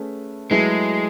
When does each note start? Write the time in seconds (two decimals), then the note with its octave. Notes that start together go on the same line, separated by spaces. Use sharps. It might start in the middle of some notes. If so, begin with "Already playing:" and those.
Already playing: A3 C#4 G#4 B4
0.51 F#3 G#3 A3 E4 G#4 B4